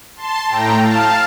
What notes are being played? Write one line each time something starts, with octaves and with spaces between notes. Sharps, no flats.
A5 C6
A2 A3 G5 A#5
F5 A5